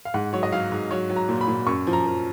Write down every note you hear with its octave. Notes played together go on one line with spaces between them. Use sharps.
F5
G#2 F#5
F#3 C#5
D#5
F#3 F5
G#2
F#3 C#5
F#3
A#5
A#2
B5
A#2
F#2 C#6
F3
A#5
F3